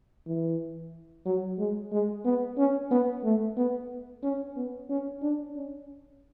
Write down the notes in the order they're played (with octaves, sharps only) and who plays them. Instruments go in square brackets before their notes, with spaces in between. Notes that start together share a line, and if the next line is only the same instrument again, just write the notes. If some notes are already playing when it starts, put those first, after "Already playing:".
[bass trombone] E3
F#3
G#3
G#3
B3
C#4
B3
A3
B3
C#4
B3
C#4
D4
C#4